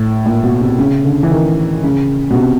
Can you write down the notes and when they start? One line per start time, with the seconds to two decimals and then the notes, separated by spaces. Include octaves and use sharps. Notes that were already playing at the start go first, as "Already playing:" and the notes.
Already playing: A2
0.25 A#2
0.43 B2
0.61 C3
0.79 C#3
1.05 D3
1.23 E3
1.31 D#3
1.83 C#3
2.30 B2
2.36 C3